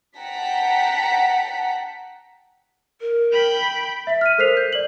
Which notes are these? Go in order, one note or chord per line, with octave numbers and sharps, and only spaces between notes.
F#5 G5 A5 A#5 B6
A#4
G5 B5
E5 B6
F6 B6 D#7
A4 A#4 C5 B6 C7 F7
G6
D5 F#7